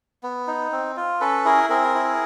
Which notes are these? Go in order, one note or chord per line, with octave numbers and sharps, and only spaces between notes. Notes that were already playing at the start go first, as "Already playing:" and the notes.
B3
D#4
C4
F4
C#4 A4 B4
E4 G#4 A#4
C4 G#4 A#4
E4